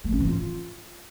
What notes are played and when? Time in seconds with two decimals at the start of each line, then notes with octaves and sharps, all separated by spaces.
0.04 A3
0.12 C#4
0.20 E3
0.28 F4